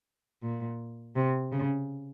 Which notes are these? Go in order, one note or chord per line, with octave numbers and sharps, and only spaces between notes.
A#2
C3
C#3